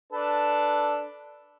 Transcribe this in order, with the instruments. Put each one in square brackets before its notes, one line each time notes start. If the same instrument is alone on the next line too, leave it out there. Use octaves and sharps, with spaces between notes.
[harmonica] D4 A4 B4